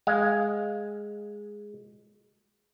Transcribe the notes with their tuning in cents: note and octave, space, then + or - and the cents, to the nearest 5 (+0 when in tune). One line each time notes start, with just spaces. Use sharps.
G#3 +0 F5 +0